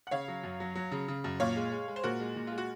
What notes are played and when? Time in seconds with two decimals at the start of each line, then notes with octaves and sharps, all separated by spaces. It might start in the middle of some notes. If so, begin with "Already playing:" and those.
0.07 F#5
0.11 C#3 C#5 F5
0.28 F#3
0.44 F#2
0.60 F#3
0.75 F#3
0.92 C#3
1.08 C#3
1.24 F#2
1.40 A#2 C#5 F5
1.56 G#3
1.72 G#3
1.88 G#3
1.96 C5
2.03 A#2 F#4 A#4
2.20 G#3
2.36 A#2
2.47 G#3 F4
2.58 F#4